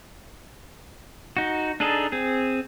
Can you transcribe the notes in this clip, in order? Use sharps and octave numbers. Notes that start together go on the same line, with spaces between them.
D#4 F#4
D4 D#4 G#4 A4
C4 G#4